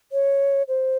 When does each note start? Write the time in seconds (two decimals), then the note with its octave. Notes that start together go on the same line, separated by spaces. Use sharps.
0.12 C#5
0.68 C5